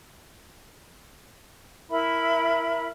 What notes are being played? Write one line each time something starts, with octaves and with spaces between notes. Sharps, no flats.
E4 A#4 E5 B5